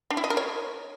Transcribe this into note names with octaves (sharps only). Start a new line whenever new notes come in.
D4
E4
D#5
A#4
C#5